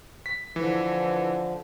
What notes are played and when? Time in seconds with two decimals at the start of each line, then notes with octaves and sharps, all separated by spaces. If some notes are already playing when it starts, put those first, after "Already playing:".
0.26 B6
0.56 D3 E3 F3